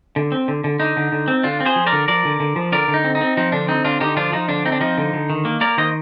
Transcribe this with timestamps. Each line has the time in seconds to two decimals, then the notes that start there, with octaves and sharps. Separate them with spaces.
0.16 D3
0.32 C4
0.48 D3
0.64 D3
0.79 D3 D#4
0.97 D3
1.12 D3
1.28 C4
1.44 D3 D4 F4
1.60 C4
1.66 G#4 C5
1.76 F3
1.87 A#4 D5
1.92 D3
2.08 F3 A#4 D5
2.25 D3
2.40 D3
2.56 F3
2.72 D3 A#4 D5
2.88 D3
2.94 D#4
3.04 C4
3.15 D#4
3.21 C4
3.37 F3 D#4
3.52 D3 D4
3.68 C4 D#4
3.84 D3 D4 F4
4.00 D3 D#4 G4
4.17 F3 D4 F4
4.32 F3 D#4
4.48 D3 D4
4.65 C4 D#4
4.72 D4
4.81 F3 D#4
4.98 D3
5.13 D3
5.30 D#3
5.45 A#3
5.61 A#3 A#4 D5
5.77 D#3 C5 D#5